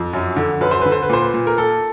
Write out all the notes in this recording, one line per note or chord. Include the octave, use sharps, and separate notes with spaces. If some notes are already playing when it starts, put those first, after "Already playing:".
Already playing: F2
F#2
D3
F#2 B4
C5
D3 B4
C5
B4
A#2 C5
B4
A#2
A#4
A#2 A4